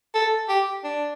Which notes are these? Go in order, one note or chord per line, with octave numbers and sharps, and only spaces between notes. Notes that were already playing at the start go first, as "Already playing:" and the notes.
A4
G4
D4